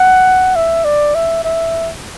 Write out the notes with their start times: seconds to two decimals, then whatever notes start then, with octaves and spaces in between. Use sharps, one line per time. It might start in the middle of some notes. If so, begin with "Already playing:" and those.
Already playing: F#5
0.56 E5
0.85 D5
1.15 E5
1.45 E5